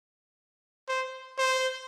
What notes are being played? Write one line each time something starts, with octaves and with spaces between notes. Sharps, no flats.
C5
C5